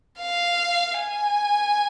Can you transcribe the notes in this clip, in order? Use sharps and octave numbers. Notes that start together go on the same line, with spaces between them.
F5
G#5